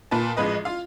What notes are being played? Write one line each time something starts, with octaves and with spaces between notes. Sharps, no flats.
A#2 B4 A5
A1 F3 G#3 B4 D#5
F4 F5